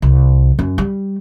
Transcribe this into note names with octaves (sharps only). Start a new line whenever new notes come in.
C2
F#2
G3